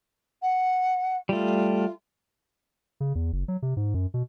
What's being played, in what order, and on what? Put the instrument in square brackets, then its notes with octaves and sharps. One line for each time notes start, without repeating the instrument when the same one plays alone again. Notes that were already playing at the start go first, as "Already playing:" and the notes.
[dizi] F#5
[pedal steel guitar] G3 A3 [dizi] F4
[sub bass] C#3
E2
F#1
F#3
C3
G#2
F#2
B2